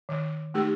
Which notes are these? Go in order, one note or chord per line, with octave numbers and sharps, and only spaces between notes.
D#3
A3 D#4 G4